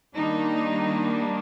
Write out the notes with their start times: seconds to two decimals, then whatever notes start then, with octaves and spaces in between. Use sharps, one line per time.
0.15 D#3 G3 A#3 D4 D#4